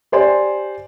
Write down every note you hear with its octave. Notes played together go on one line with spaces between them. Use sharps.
G4 C5 D5 G#5 C6